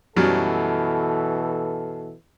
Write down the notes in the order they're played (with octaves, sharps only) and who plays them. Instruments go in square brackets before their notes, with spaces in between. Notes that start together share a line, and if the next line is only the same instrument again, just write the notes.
[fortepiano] F#2 F#3 G3 [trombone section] B2 E3 A4